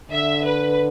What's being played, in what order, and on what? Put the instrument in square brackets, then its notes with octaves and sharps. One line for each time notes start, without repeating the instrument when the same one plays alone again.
[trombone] D3 [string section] E5
[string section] B4